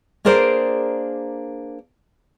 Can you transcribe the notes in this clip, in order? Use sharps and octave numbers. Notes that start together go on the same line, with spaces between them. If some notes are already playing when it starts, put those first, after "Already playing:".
A#3 D4 G#4 A#4 C5 D5